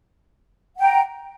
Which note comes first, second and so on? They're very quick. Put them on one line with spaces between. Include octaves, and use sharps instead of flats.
F#5 G5 A#5